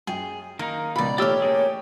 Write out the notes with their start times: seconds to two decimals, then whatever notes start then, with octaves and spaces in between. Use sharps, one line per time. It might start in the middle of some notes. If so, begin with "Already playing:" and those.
0.07 F#2 G#4 G5
0.59 D#3 A#3 D#4 A#4
0.96 C#2 B2 D5 B5
1.18 A1 A3 G4 C#5 D5 D6 E6 F6
1.42 A#3 C#4 G#4